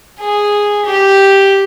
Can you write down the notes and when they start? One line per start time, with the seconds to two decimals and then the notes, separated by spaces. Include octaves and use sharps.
0.20 G#4
0.87 G4